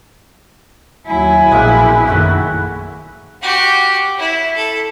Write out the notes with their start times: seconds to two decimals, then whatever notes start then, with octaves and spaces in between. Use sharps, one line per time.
1.07 D#2 F#3 E4 G#5
1.51 A#1 B2 G#3 A#3 C4
2.07 F#2 D#3 A3 F#4 F#5
3.42 F#4 G4
4.18 E4
4.56 A4